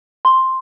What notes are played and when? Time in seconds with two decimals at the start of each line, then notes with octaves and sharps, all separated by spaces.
0.25 C6